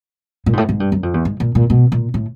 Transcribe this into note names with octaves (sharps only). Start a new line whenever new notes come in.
A#2
G#2
A2
G#2
G2
F#2
F2
E2
G#2
A#2
A#2
B2
A#2
A2